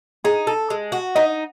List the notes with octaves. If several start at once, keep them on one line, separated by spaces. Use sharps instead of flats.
D#4 G#4
A4
G#3
F#4
D#4 D#5